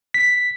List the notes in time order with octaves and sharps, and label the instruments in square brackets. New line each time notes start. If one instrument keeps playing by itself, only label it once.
[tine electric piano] B6